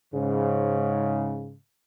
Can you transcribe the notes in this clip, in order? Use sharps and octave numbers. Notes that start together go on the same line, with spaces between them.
G#2 C#3